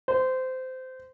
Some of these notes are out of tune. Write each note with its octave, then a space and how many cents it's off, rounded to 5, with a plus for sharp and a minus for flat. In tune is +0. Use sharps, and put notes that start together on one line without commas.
C5 -20